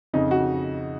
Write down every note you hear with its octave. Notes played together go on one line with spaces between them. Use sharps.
F2 C#3 D#4
F#4